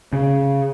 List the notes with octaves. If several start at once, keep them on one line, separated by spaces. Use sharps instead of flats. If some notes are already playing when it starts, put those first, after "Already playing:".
C#3